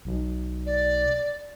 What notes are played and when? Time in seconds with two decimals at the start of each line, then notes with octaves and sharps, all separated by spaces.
0.05 B1
0.66 D5